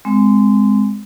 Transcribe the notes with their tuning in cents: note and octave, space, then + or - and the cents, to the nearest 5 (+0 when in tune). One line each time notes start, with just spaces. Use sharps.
G#3 +0 C4 -20